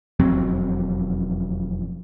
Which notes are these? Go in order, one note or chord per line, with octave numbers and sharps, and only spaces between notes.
E1 F2 F#3 C4